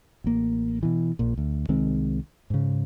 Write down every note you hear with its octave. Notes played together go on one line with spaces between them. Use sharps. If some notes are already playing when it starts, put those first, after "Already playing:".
A1 A#3
B2 E3
A#1 A#2
D2
C2 D#3 G#3 C4
G#2 C#3